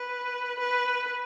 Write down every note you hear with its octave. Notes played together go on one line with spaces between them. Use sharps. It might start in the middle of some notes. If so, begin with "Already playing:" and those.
Already playing: B4
B4